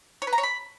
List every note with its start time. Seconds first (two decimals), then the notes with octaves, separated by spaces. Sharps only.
0.22 C#5
0.27 B4
0.33 A#5
0.38 C#5
0.43 B5